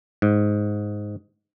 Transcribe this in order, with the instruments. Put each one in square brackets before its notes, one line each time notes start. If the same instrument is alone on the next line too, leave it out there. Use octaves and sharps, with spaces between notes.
[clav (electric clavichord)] G#2